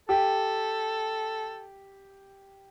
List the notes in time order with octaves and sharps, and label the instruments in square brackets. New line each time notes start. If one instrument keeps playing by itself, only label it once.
[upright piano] G4 [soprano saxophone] A4